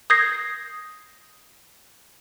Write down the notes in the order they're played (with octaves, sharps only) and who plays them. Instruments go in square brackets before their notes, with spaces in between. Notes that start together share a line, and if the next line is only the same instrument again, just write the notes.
[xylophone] D#6 G6 G#6 A#6 C7